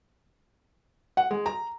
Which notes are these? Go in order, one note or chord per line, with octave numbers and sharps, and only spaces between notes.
F#5
G#3
A#5